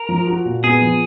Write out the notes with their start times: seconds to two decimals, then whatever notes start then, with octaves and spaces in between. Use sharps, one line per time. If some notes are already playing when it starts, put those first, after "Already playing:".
Already playing: A#4
0.09 F3
0.27 F#4
0.45 A#2
0.63 B3 G#4
0.81 F3